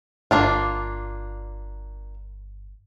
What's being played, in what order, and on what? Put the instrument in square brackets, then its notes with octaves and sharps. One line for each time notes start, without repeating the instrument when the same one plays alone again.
[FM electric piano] G1 [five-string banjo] A#3 D4 F4